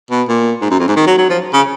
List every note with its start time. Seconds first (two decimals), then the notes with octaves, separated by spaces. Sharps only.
0.11 B2
0.28 A#2
0.61 G#2
0.71 F#2
0.79 F2
0.88 G#2
0.96 D#3
1.07 F#3
1.18 F#3
1.30 F3
1.53 C#3